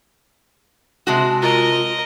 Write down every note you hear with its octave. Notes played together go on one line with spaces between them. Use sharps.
C3 G#3 F#4 A5
F4 A#4 D#5